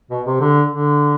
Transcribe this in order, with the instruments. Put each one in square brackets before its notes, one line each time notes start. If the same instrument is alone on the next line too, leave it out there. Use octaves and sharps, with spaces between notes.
[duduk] B2
C3
D3
D3